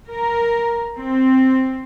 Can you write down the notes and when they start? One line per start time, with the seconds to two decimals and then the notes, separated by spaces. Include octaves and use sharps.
0.10 A#4
0.98 C4